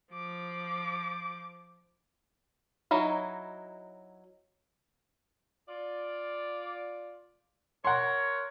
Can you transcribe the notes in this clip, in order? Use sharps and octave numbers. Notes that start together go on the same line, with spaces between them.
F3 D6
F#3 D#4 E4 D#5
F4 D5
A#4 C#5 F#5 C6